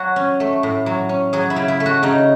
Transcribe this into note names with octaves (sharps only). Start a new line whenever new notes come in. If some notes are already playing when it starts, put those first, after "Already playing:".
Already playing: F#3 F#4
C#4
A3
A2
F#3
C#4
F#3 G#4
E4
C#3
E4
A3
F#4
C#3 D#4